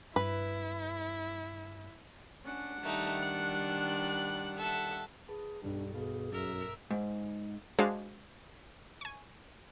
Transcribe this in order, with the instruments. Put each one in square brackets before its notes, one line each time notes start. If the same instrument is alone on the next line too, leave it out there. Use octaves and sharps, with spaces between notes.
[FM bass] G2 [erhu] E4 [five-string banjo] B4
[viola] C#4 [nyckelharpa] D4 F#5
[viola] D#3 G3 [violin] A3 D#4
[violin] F#6
[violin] A4 [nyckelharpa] E5 F#5
[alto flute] G#4 [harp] B4 A5
[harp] B1 G2 [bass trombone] G3 [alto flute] D4
[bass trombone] B2 [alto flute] G#4 [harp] A4 B4 F5
[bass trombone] F#2 [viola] A#4 E5
[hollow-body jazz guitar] G#2
[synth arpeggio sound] G#3 D4 F#4 G#4 C5 F5
G#5 C#6